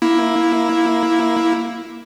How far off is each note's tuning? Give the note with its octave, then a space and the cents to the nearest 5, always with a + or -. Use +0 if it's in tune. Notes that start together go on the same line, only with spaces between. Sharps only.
A#3 +15 E4 +0